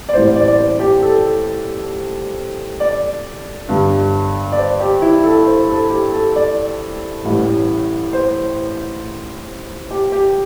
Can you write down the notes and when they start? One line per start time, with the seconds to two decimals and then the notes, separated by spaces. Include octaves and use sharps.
0.09 D5
0.13 A1 A2 G3 C4 C5
0.36 D5
0.48 D5
0.58 C5
0.79 G4
1.03 A4
2.80 D5
3.69 G1 G2 G3
4.52 D5
4.58 C5
4.80 G4
5.02 E4
5.24 A4
5.46 C5
5.69 A4
5.90 G4
6.12 A4
6.36 D5
7.24 A1 A2 E3 G3
8.13 C5
9.91 G4
10.12 G4